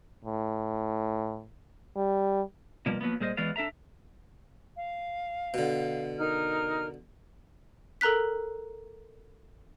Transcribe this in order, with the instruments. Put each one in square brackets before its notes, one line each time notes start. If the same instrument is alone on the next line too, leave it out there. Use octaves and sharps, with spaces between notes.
[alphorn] A2
G3
[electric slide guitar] B2 F3 G3 A#3
F3 F#3 A#3 B3
A#2 G3 G#4 C5 D#5
E3 F#3 G#3 B3 D5 F5
D4 A4 E5 A#5
[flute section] F5
[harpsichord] B2 D3
[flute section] D#4 A#4 F6
[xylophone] A4 A#4 A#5 F#6 B6